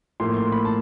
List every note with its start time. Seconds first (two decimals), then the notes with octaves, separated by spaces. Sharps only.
0.20 A2 F3 A#3 C6
0.37 C6
0.52 B5
0.65 A5